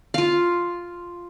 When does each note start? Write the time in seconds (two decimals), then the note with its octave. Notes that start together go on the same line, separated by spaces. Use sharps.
0.14 F4 F5